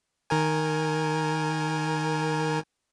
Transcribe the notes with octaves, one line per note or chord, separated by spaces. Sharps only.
D#3 A#4 G#5